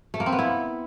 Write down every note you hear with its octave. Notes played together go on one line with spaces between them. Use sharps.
A3
A#3
C4
B3
E4